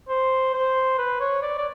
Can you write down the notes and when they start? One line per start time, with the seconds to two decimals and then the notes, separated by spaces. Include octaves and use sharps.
0.09 C5
0.54 C5
0.98 B4
1.20 C#5
1.42 D5
1.58 D5